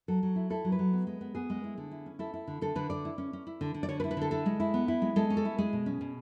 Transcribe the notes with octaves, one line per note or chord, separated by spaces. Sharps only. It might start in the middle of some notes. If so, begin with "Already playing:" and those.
F#3 A4
F#3
E4
E4 A4
F#3
B4
F#3
B3
G#3
B3
B3 G#4
G#3
E4
D3
E4
C#4
E4 A4
E4
D3
D3 A4
D3 B4
D3 D5
E4
C#4
C#4
E4
D3
D3
D5
D3 C#5
B4
E4
B4
D3 A4
E4 A4
G#3
E4
B3
E4
G#3
G#3 A4
C#4
A4
E4
G#3 G#4
B2
C#4
B2